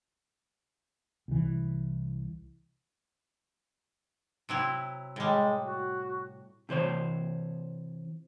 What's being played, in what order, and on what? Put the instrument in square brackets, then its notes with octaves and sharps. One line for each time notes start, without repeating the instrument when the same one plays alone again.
[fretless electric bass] C2 E3
[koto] C3 F#3 E4
[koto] A2 G3 [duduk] G#3
[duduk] F#4
[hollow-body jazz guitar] C3 E3 C5 C#5